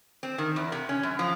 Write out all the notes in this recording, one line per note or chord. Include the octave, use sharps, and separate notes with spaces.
C4
D#3
E2
C3
C#4
F#2
F3